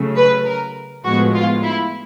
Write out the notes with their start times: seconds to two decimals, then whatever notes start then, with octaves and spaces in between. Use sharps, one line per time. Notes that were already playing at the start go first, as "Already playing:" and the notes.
Already playing: C#3 F#3 A3
0.16 B4
0.46 A#4
1.04 A2 F3 G#3 B3 F#4
1.34 F4
1.64 E4